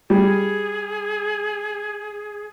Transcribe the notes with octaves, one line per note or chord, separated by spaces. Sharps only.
G3 G#4